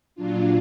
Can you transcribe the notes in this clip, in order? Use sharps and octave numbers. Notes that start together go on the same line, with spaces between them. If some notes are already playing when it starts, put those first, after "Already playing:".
A#2 F#3 D4 F4